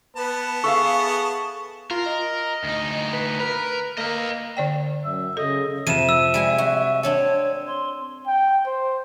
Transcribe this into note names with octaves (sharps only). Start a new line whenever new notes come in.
B3 B4 A5
G#4 A4 E5 F5 C#6
F4 A#4
D#5
D2 D#4
B4
A#4 B4
A#3 D#5 F5
D3 D5 G5
F#2 E5
C#3 A4 D#5
F2 C3 F3 E5 D#7 E7
E6
G3 G#3 G#5
F#4
C4 D4 A4 C#5
C6
G5
C5